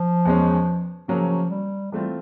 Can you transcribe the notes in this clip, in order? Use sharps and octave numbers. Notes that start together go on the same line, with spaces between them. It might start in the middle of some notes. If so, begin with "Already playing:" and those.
Already playing: F3
E2 B2 G#3 C#4
C#3 F3 F#3 A#3 C#4
G3
E3 G3 A3 C4 F4